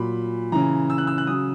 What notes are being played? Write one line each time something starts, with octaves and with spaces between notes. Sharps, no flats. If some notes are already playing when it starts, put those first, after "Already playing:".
Already playing: A#2 F#3 B5
C#3 E3 A#5
E6
F#6
E6
F#6
C#3 F#3 D#6